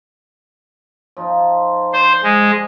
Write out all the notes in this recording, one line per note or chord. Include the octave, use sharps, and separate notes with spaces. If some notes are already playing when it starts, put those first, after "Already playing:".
F3 D#4 F4
C5 D5
G#3